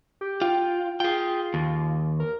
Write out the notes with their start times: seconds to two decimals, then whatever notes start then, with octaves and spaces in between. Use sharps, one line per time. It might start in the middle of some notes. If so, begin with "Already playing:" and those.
0.21 G4
0.41 F4 G5
1.00 F4 G#4 G5
1.54 D#2
2.20 A#4